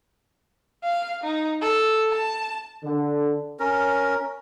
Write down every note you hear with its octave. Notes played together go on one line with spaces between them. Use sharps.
F5
D#4
A4
A5
D3
C#4 A#4